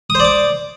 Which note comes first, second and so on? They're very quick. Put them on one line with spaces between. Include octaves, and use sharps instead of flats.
D#6 C5 D5 D6